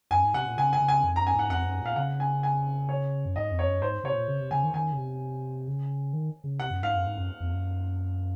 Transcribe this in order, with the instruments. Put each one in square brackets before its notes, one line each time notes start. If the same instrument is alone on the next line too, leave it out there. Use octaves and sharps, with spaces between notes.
[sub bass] F#2 [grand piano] G#5
[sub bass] G#2
[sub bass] C3 [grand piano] F#5
[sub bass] A#2
[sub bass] C#3 [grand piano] G#5
[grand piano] G#5
[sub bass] C#3
[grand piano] G#5
[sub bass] F2
[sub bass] F#2 [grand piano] A#5
[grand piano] G#5
[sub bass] G#2 [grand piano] F#5
[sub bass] F2 [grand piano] F#5
[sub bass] F#2
[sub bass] A#2 [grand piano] F5
[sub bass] C#3 [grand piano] F#5
[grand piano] G#5
G#5
C#5
[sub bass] F#2
[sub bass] G#2 [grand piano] D#5
[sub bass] F2
[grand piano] C#5
[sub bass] F#2
[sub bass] G#2 [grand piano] C5
[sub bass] C3 [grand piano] C#5
[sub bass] A#2
C#3
C3
[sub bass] C#3 [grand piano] G#5
[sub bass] D#3
[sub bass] D#3 [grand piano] G#5
[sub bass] C#3
C3
C#3
D#3
C#3
[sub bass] C3 [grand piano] F#5
[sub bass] F#2
[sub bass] G#2 [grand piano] F5
[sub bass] F#2
G#2
F#2
F2
F#2